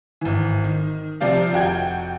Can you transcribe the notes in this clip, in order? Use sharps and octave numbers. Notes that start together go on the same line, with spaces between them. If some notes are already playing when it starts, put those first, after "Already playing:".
G#1 E3
D#3
C3 F3 C4 G4 D5 F5
F1 F#4 G5 G#6